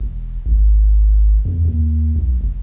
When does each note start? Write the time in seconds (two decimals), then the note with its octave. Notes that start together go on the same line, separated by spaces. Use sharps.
0.01 E1
0.46 G#1
1.45 E2
1.65 D#2
2.16 B1
2.41 F1